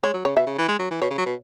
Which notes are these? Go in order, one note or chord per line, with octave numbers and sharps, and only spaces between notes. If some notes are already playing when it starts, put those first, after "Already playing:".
G#3 C#5
F#3
C#3 C#5
B2 E5
C#3
E3
G#3
F#3
E3
B2 C#5
C#3
F#3
B2